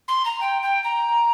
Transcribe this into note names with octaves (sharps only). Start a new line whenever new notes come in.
C6
A#5
G5
G5
A#5